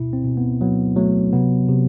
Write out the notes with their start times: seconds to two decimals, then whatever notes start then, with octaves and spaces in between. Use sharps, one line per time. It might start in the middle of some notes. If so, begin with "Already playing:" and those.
Already playing: B2 E4
0.13 C4
0.25 B2
0.37 B3
0.61 F#3 B3
0.97 F#3 A3
1.33 C3 B3
1.68 C3